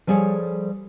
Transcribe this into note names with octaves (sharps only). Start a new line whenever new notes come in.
F3 G3 G#4 A4 C#5